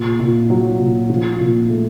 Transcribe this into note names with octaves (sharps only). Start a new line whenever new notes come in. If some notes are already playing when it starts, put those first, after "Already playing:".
Already playing: A#2
A#2
F#3
A#2
F3
A#2
A3